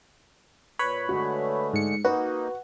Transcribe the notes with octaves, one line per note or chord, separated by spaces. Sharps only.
A#2 B4 C#5 B5
D3 G#3 A3 F#4
G#2 C#7
A#3 D#4 F#4 B4